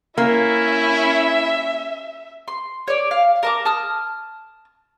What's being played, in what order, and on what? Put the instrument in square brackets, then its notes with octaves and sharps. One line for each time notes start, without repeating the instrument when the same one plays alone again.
[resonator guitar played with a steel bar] A#3 [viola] C#4 [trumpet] E4 [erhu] E5
[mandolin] C6
C#5 D5
F5
A#4 A5 D6
A5 D#6 F6